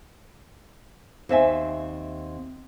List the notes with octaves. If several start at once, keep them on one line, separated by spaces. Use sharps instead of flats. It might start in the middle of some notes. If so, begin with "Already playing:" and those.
D#2 C4 E5 G#5